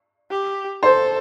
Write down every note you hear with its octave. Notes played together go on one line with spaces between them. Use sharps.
G4
A4 C5